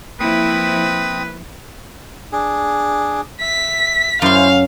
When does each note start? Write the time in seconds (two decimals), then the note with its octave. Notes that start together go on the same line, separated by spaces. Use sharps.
0.20 F3 A#3 C4 E4 B4 D#6
2.32 D4 G#4
3.41 E5 B6
4.22 F#2 C#4 E4 C5 F5